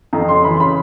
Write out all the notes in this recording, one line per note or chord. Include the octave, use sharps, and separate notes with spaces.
F2 A#5
C#3 C6
E3 B5
C6
C#3 B5